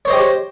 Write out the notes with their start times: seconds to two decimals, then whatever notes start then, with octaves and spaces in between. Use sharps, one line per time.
0.05 C#5
0.08 C5
0.10 D#5
0.13 G4